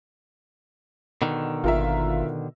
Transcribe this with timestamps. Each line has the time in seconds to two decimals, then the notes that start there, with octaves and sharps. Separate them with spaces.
1.22 B2 D3 D#3
1.64 G#1 F4 A#4 E5